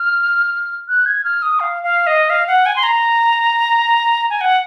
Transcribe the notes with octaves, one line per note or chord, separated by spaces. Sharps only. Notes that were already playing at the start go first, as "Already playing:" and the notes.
Already playing: F6
F#6
G#6
F6
D#6
F5
F5
D#5
F5
F#5
G#5
C6
A#5
G#5
F#5